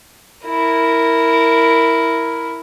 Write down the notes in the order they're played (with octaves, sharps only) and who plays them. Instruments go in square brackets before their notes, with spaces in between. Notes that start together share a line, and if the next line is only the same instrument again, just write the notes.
[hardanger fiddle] E4 A#4